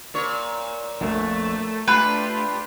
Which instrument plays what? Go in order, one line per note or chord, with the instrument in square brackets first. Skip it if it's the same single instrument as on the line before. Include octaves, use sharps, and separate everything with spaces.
[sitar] A#2 C#5
[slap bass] A#1 F2 [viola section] A3
[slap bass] A3 [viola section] D4 F4 G4 [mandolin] B4